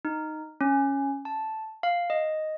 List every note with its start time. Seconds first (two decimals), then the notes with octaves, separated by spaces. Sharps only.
0.05 D#4
0.61 C#4
1.25 A5
1.83 F5
2.10 D#5